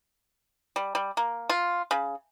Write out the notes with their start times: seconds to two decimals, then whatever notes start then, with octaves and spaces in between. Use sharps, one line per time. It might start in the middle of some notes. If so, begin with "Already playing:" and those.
0.76 G3
0.95 G3
1.17 A#3
1.49 F4
1.91 C#3